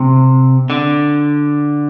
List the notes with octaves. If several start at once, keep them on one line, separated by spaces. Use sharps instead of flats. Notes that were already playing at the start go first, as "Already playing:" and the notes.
Already playing: C3
D3